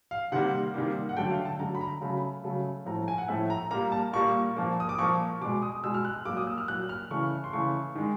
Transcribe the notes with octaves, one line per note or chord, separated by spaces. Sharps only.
F5
C3 D#3 G3 A#3 F#5
C3 D#3 G3 A#3
F#5
D3 F#3 A3 G5
F5
A5
D3 F#3 A3 A#5
B5
A#5
C#3 F#3 A3 B5
C#3 F#3 A3
A2 F3 A3 A#5
G#5
F#5
A2 F3 A3 E5
A#5
A#2 G3 A#3 A#5
A5
A#2 G3 A#3 C#6
A#2 F3 A#3
D#6
D6
A#2 F3 A#3 C#6
B2 G#3 D6
D#6
B2 G#3 E6
F6
F#6
E6
A#2 F#3 A#3 D6
D#6
E6
F6
A#2 F#3 A#3 F#6
F6
C#3 E3 A3 C#6
C6
C#3 E3 A3 C#6
D#3 G#3